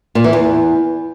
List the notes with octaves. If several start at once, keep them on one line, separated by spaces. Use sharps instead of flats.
A#2
E3
E2